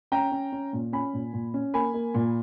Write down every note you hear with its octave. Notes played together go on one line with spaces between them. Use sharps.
C#4 G5 A#5
C#4
C#4
A#2
C#4 G#5 B5
A#2
A#2
C#4
A#3 G#5 B5
A#3
A#2